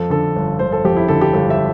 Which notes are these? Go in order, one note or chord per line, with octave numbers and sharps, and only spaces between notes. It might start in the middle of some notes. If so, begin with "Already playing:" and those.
Already playing: F2 A4
D3 A4
G1
G1 C5
A4
F2 G4
E4
D3 A4
G4
G1 A4
E5